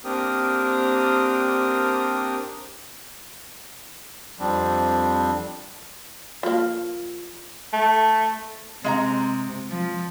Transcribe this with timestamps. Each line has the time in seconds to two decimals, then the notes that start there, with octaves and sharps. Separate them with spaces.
0.04 A#3 C4 D4 G4 A#4 D#6
4.40 F2 F3 G3 C4 D4
6.43 F3 A#3
7.73 A3
8.84 C3 G#3 E5 A#5
9.70 F3